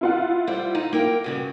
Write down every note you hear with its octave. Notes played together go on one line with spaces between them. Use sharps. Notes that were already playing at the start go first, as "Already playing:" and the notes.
E4 F4 F#5
G3 C5
D#4
A#3 A#4 G5
G2 C#3 F#4